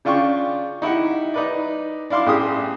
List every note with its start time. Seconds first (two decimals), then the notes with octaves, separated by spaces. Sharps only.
0.05 C#3 D4 F4 G5 C#6
0.82 D#4 E4 G4 F#5
1.34 D#4 B4 D5
2.10 D4 E4 F5 C6 D6
2.26 A1 G4 G#4 D#6